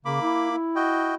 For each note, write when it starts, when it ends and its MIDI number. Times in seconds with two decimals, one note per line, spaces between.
0.05 0.20 49
0.05 0.56 58
0.05 0.56 83
0.05 0.56 86
0.22 0.51 64
0.52 1.14 64
0.76 1.15 66
0.76 1.15 75
0.76 1.15 79